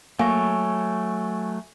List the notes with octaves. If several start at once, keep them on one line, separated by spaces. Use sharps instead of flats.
F#3 A3 A#3 G#5 C#6 A#6